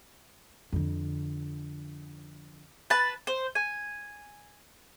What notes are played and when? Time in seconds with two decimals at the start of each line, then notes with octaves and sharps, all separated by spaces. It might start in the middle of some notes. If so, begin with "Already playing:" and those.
0.73 F2 D3
2.90 B4 A5
3.27 C5
3.55 G#5